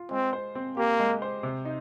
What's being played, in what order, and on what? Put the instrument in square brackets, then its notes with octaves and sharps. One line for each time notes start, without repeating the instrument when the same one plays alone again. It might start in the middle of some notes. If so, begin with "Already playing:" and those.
Already playing: [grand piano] F4
[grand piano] G#3 [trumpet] C4
[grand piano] C5
C4
[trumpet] A#3 [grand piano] G4
[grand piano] G#3
C5
C3
D#4